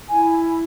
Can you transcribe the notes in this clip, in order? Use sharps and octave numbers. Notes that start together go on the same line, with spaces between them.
E4 G#5